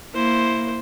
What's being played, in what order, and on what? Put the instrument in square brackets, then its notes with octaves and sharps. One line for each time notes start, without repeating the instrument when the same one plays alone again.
[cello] A#3 [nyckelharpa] E4 C5